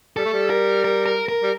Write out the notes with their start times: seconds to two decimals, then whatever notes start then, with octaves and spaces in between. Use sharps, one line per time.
0.17 G3 A4
0.25 A3
0.34 G3
0.50 A#4
0.84 A#4
1.06 A#4
1.29 A#4
1.43 G3